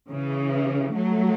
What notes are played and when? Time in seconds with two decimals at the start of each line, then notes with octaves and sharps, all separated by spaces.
0.10 C#3 E3
0.93 F#3 A3